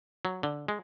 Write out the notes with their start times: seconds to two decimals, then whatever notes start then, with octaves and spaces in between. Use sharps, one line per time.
0.25 F#3
0.43 D3
0.68 G#3